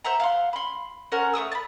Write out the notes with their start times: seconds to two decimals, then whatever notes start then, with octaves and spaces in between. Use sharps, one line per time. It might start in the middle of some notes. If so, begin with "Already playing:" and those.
0.04 C5 E5 F#5 A#5
0.20 F5 F#5 C6
0.53 B5 C6
1.12 C#4 A#4 C5 F#5
1.33 A3 A#4 D#6 E6
1.52 A5 B5